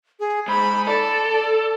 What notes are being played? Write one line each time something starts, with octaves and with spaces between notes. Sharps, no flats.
G#4
G#2 B5
A4 D5